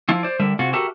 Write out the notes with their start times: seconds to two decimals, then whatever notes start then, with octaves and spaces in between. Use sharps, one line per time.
0.09 F3 E4 F4
0.23 C5 D5
0.39 D3 G3 A#4 E5
0.59 C3 F4 F#4 G#4
0.73 F#4 G4 A4 A#4 E5